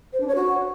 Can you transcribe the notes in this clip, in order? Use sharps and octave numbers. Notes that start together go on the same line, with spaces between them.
C5
D4
C#5
F#4